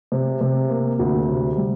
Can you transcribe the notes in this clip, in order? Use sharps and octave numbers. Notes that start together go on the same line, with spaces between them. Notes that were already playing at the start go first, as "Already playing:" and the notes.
C3
C3
A#3
D2
C3
G3